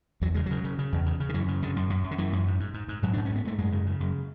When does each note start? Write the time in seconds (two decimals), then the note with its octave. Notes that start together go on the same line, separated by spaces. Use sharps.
0.21 E2 F#3
0.34 C#3 G#3
0.46 C#3 F#3
0.64 C#3
0.79 C#3
0.92 E2
1.06 C#3
1.20 C#3
1.29 D3
1.34 F#2 E3
1.48 C#3
1.62 F#2 D3
1.76 F#2
1.90 F#2
2.04 F#2
2.11 D3
2.18 F#2 E3
2.33 F#2
2.47 G#2
2.60 G#2
2.74 G#2
2.88 G#2
3.03 G#2 F#3
3.13 G#2 D4
3.25 G#2 C#4
3.36 B3
3.45 G#2 A3
3.58 F#2 G#3
3.72 C#3
3.86 C#3
4.00 F#2